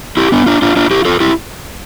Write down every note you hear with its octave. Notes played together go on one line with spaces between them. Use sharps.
E4 G4
B3 D4
D4 F4
D4 F4
D4 F4
E4 G4
F4 A4
E4 G4